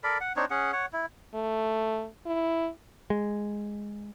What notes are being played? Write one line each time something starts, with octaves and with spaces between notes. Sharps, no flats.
A4 A#4 D5 B5
F#5
C4 D4 D#4 C#5
C#4 G#4 F#5
C#5 F#5
E4
A3
E4
G#3